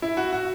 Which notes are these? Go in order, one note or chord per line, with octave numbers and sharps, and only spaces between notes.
E4
F#4
F#4